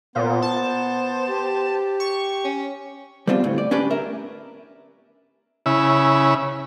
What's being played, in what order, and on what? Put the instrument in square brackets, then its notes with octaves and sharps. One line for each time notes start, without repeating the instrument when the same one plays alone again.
[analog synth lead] A#2 [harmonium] B3 [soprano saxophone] C5
[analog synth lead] A5
[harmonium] G4
[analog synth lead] C#6
[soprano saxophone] C#4
[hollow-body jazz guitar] G3 B3 C4 D4 F4
D2 A2
D5
C#4 D4 G4 B4
A#4 E5
[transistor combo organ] C#3 E4